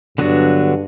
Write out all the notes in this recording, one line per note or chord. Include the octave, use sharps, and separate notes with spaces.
G2 D3 F#3 B3 D4 F#4